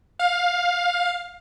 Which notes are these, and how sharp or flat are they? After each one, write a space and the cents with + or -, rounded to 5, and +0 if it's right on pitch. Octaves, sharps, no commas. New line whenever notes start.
F5 +20